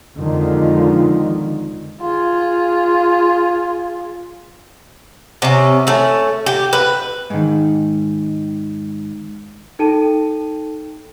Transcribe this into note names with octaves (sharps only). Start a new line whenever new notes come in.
F2 D3 D#3 F3 G#3
F4 G#4
C3 C#4
A3 C#4
G4
B4
G#2 D#3
D#4 A4 G5 A5 D#7